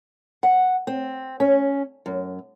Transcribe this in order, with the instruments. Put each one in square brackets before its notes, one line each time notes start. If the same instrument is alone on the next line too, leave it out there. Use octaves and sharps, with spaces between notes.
[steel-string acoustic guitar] F#5
C4
C#4
F#2